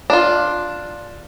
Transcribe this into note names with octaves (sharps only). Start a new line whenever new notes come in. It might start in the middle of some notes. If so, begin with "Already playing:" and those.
D4 F4